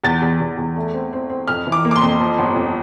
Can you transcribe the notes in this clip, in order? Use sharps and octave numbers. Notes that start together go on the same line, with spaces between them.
E2 A6
E2
E2
E2
A3
C4
C4
C4
F2 F6
E3
D6
A#3
D6
C6
F2
F3
G1
F2